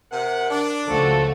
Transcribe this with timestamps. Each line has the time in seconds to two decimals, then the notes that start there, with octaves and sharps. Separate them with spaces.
0.12 C3 A#4 F#5
0.50 D4
0.88 C#2 F3 A3 F#4 A4